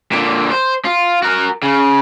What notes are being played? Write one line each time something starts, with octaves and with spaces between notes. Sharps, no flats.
A#2 D3
C5
F4
F#4 A#4
C#3